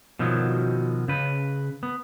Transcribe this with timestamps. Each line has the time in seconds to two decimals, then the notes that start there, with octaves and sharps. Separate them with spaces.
0.19 B2 D#3 F3 F#3
1.08 C#3 B4
1.83 B3